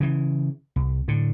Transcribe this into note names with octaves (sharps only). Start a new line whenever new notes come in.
C#3 E3
C2
A2 D3